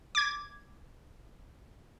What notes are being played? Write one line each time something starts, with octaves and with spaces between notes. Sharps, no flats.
D6 G#6